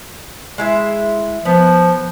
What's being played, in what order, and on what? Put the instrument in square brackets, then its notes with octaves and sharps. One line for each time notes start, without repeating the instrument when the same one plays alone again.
[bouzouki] G#3 E4 E5
[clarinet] F3 [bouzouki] B3